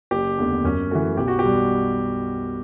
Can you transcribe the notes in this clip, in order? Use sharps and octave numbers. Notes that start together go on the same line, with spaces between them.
F#1 G4
E2 D3 A3
F#2 C#4
E3 A3 F#4
B1 G4
F#4
G4
B2 G3